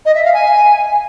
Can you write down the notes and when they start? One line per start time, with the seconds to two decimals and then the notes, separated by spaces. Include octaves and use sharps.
0.05 D#5
0.15 E5
0.24 F5
0.34 G#5